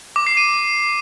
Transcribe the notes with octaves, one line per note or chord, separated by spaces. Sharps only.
D6
C7
D#7